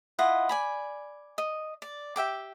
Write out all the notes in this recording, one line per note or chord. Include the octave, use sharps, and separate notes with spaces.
E4 F4 D#5 F#5
D5 G#5 B5
D#5
D5
G4 E5 G5 D6